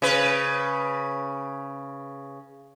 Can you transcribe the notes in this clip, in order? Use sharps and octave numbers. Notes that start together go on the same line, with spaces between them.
C#3 B4